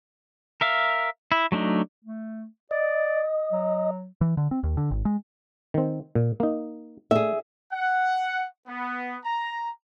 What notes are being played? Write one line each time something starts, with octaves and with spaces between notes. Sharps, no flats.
A#4 E5 F5
E4
F#3 A3 D4 D#4
A3
D5 D#5
F#3
E3
D3
C4
D#2
D3
G#1
G#3
D#3 C4
A#2
A#3 D#4
A3 G#4 E5
F#5
B3
A#5